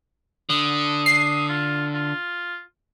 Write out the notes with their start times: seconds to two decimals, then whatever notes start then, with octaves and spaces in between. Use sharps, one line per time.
0.50 D3 D#6
1.06 C7
1.49 F4
1.94 F4